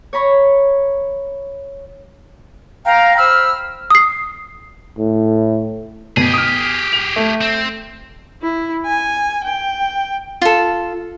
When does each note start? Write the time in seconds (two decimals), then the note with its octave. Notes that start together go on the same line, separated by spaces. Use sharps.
0.13 C#5 A#5 B5 C#6
2.86 F5 G5 A#5
3.17 C5 B5 E6 F6
3.90 D#6 C7
4.98 A2
6.17 B2 G4 G#4
6.33 D#6 F6
6.93 F7
7.16 A3
7.41 C4
8.42 E4
8.87 G#5
9.45 G5
10.42 F4 A4